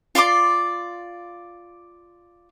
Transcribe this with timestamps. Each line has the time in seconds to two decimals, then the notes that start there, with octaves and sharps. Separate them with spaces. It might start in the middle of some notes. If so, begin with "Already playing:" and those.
0.15 F4 D5 C6 D6